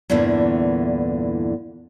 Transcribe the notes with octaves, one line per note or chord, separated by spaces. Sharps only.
E2 G2 A#2 D3 E3